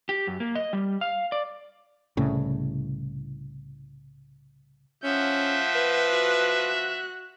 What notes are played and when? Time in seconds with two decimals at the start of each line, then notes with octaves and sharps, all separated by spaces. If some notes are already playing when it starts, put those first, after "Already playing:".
0.09 G4
0.27 F#2
0.40 A#3
0.55 D#5
0.73 G3
1.01 F5
1.32 D5
2.17 C2 A2 C#3
5.04 F3 C#4 E5 F#5 G6
5.75 B4
6.10 F#4 F#6